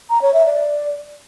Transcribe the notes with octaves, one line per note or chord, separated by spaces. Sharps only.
A#5
C#5
E5
D5